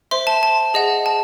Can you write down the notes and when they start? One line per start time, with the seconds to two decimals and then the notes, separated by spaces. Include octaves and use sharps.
0.11 C5 E5 C6
0.27 A5
0.43 A5
0.74 G#4 D#5 F#5
1.06 A5